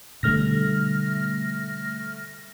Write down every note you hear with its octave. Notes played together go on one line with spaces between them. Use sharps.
B2 D3 G3 A3 F6 A#6